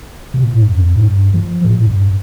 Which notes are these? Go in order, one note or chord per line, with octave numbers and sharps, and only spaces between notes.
C3
A#2
A2
G2
F2
A2
G2
F3
A2
A#2
A2
G2